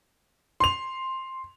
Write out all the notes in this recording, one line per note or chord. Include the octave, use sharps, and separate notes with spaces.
C6 F7